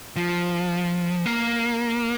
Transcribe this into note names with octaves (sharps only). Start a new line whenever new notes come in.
F3
A#3